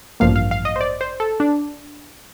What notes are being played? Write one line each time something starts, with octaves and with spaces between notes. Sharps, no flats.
A1 G2 F3 A#3 F5
F5
F5
D#5
C5
D5
C5
A4
D4